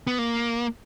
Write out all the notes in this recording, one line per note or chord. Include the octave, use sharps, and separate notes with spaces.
B3
A#3